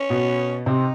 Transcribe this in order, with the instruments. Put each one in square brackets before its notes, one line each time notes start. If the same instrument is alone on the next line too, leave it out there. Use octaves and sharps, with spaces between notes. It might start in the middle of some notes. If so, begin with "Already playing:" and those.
Already playing: [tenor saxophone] C#4
[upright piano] B2 B3
[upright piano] C3 C4 [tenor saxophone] D#4